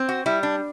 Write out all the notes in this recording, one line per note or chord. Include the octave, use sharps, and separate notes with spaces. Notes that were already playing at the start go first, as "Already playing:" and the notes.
Already playing: C4
F#4
G3 E4
D4